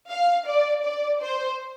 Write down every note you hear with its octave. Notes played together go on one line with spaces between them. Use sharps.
F5
D5
D5
C5